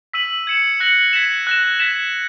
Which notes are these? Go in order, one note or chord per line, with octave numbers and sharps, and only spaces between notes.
E6 B6 D#7 F#7
G#6 C#7 E7
F#6 A#6 C#7 F#7
G#6 B6 E7
F#6 A#6 E7
G#6 B6 E7